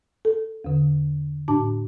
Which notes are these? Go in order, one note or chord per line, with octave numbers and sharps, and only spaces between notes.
A4
E2 D3
A2 D4 A5 D6